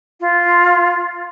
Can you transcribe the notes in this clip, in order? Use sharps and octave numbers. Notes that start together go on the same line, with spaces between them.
F4